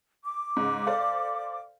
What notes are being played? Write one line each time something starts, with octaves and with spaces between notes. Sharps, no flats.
D6
G#2 C#3
A4 C5 D5 F5